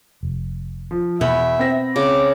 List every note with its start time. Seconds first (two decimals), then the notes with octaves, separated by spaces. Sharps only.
0.23 F1
0.91 F3
1.21 E2 B2 B3 E5
1.59 C4 A#6
1.96 C#3 D6